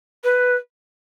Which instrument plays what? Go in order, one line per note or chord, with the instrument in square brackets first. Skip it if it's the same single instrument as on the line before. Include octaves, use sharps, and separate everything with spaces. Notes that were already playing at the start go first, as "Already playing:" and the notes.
[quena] B4